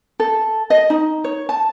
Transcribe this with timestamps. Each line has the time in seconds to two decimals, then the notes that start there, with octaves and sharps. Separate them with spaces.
0.20 A4
0.70 D#5
0.90 D#4
1.24 C#5
1.49 A5